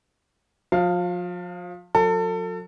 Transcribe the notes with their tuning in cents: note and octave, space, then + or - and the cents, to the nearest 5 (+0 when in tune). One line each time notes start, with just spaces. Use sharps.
F3 +35 F5 +0
F#3 -40 A4 +30